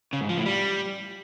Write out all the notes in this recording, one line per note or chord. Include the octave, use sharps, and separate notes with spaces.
C#3
G#2
F3
A2
G3